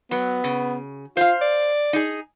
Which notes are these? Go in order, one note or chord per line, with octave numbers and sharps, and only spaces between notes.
F#3 B3
C#3
F4 C5 F5
D5
D#4 G#4